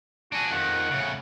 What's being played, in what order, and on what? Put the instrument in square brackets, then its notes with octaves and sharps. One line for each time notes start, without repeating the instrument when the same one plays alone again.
[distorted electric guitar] D4 G#4 [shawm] F#4
[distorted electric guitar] F2 D#3 [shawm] F#5
[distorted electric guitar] A2 C#3